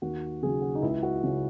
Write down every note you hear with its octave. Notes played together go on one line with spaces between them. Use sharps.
D#2 F#4
C#3 F#3 G#4
F#4
D#4
C#2 E4
F#4
C#3 F#3 C#4